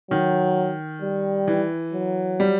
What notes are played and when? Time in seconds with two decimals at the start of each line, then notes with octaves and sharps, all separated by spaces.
0.11 D#3 F#3
1.02 G3
1.48 E3
1.93 F#3
2.40 G3